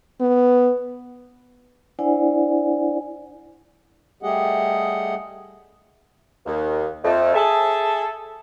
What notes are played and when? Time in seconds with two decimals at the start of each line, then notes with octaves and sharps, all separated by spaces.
0.21 B3
1.99 D4 E4 C5 D5 F#5 G#5
4.23 G3 A3 G4 G#4 D#5 F#5
6.46 D#2
7.05 F2 A3
7.35 G#4 A4 E5 A5